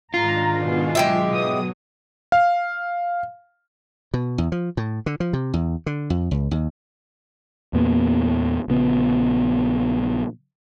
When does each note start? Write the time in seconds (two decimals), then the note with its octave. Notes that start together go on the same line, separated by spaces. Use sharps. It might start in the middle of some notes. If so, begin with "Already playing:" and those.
0.14 G#2 D#3 D4 F4 A#5
0.64 B2 G#4
0.95 F#3 G#3 G4 E5
1.32 B2 D#6
2.32 F5
4.14 B2
4.38 E2
4.52 F3
4.77 A2
5.06 D3
5.20 F3
5.33 C3
5.54 E2
5.86 D3
6.10 F2
6.31 C#2
6.51 D#2
7.73 E2 A#2 A#3 B3
8.68 A#1 C#3 B3